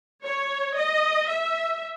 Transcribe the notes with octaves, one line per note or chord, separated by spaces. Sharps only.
C#5
D#5
E5